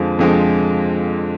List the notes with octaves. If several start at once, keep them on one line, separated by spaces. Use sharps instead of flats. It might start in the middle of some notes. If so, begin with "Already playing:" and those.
Already playing: F2 D3 F3 G#3 C4
F2 D3 F3 G#3 C4